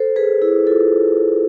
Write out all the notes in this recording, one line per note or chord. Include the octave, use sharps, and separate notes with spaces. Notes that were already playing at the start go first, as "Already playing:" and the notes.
Already playing: A4 C5
G#4 B4
E4 G#4
F4 A4